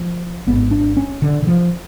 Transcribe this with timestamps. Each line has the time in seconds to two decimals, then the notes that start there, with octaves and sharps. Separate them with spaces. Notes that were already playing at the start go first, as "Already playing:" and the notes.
Already playing: F3
0.47 G#1 G#2 B3
0.71 D4
0.97 C#4
1.22 D3
1.42 D3
1.47 F3